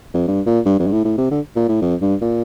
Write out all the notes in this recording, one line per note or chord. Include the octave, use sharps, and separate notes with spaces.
F2
G2
A#2
G2
F2
G2
A2
A2
C3
D3
A#2
A2
F2
G2
A#2